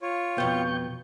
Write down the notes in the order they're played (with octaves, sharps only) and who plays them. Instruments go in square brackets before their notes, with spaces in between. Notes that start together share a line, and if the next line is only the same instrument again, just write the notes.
[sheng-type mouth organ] F4 C#5
[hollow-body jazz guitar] F2 B2 B3 [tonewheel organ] G5 C#6 G6